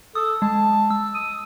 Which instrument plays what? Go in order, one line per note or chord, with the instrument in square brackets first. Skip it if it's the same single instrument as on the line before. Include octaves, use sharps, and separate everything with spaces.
[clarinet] A4 [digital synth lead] D#6
[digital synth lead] G#3 [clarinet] A5
[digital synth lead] E6
[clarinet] D#6